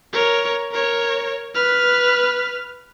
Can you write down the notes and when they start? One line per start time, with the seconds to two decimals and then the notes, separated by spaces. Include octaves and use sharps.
0.13 A#4 C#5
0.72 A#4 C#5
1.55 B4 F6